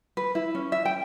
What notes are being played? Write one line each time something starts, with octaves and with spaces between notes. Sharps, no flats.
B4
E4
C#4
E5
G5